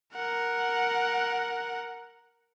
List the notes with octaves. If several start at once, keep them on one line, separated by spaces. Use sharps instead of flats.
A#4 F#5